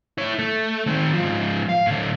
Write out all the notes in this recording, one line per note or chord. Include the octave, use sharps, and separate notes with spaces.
E4 C#5
A3
D#3 C4
G#2 F3
F5
A2 D3